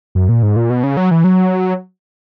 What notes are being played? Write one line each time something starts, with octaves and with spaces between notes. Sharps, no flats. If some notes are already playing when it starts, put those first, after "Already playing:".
F#2
A#2
G#2
A#2
B2
C#3
F#3
E3
F#3